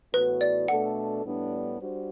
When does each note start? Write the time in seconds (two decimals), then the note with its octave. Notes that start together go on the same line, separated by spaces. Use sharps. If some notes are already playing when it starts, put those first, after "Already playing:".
0.13 A2 E3 B3 F#4 B4
0.41 D5
0.68 B2 A3 D4 A4 F#5
1.25 A2 G3 B3 D4
1.80 G3 D4 F#4 C5